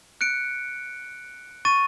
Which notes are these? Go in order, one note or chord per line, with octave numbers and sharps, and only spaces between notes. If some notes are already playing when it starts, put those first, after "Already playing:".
F#6 C#7 D7
C#6 A6 D#7